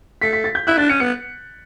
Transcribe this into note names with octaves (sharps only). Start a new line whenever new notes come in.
A3 B6
B6
A6
G6
E4 F#6
D4 A6
C#4 C#7
B3 C#7